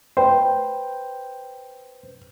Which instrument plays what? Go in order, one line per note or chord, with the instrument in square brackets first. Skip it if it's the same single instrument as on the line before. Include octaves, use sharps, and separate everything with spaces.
[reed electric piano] B4 C5 [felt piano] G5